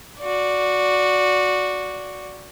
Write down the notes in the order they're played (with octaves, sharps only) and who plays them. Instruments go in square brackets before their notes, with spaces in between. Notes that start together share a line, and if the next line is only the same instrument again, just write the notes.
[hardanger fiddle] F#4 D5